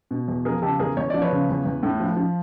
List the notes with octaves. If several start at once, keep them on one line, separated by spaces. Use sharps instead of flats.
B2
E2
F3 G#4 A#4
C#3 G4 A4
E2 G#4 A#4
E2 C#5
F3 D5
B4 C#5
C#3
E2
E2
A2
F3
F3